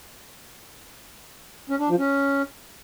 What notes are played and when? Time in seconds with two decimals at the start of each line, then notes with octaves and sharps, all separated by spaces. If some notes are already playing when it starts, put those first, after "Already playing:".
1.70 C#4
1.79 D4
1.89 F3
1.99 C#4